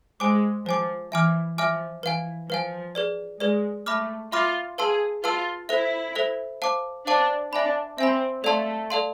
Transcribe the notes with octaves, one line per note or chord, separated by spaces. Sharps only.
G#3 C5 G#5 D6
F3 C5 G#5 D6
E3 E5 G#5 D6 F6
F3 E5 G#5 D6 F6
E3 B4 F5 G#5
F3 B4 F5 G#5
G#4 B4 D5
G#3 G#4 B4 D5
A3 E5 B5 D6 F6
F4 E5 B5 D6 F6
G#4 B4 F5 A5 C6 E6
F4 B4 F5 A5 C6 E6
E4 A4 C5 E5
A4 C5 E5
C5 F5 A5 D6
D4 C5 F5 A5 D6
D4 E5 G#5 B5
C4 E5 G#5 B5
A3 A4 D5 F5 A5 C6
A4 D5 F5 A5 C6